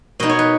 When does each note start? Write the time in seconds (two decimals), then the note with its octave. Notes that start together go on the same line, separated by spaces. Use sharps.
0.20 B2 B3 D#4 D#5
0.29 C#5
0.39 B4